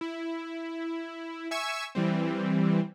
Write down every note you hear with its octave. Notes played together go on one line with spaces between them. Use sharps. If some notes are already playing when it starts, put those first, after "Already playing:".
E4
E5 G#5 C#6 E6 G#6
E3 G3 C4